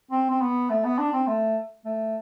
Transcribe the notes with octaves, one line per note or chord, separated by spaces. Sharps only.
C4
C4
B3
A3
B3
D4
C4
A3
A3